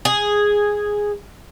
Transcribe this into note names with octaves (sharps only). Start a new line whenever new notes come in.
G#4